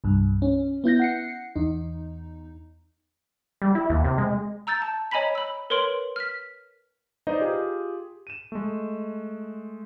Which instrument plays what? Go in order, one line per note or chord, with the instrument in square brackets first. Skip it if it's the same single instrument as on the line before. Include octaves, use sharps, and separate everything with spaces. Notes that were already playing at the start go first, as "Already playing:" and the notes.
[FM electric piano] C2 G2
C#4
B3 E4 G6 A#6
F#5 C7 C#7
E2 D#4
[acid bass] G3
E4
D#2
C3
G#3
[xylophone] A#5 E6 G6 A6
A5
C#5 D#5 G#5 A#5 B5 B6
B5 E6
A#4 B4 C#5 C6 D7 F#7
F6 B6
[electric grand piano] D#4 B4 C5 D5 D#5
F4 G4 G#4
D#7 E7
G#3 A3